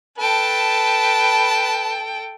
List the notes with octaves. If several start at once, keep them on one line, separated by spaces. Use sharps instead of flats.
A4 B4 G5 A5